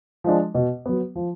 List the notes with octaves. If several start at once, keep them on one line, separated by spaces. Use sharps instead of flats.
F3 G#3 D4
B2
F#3 B3
F3